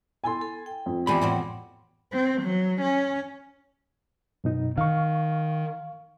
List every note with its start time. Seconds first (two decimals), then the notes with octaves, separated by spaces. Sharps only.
0.24 B3 E4 A4 G#5 C6
0.41 A4
0.66 G5
0.86 F2
1.07 E2 G#3 G4 G#4 D5 B5 D6
1.21 A2 C4 F#4 F#5
2.13 C4
2.42 F#3
2.81 C#4
4.44 F#2 B2 D#4
4.78 D#3 F5 C#6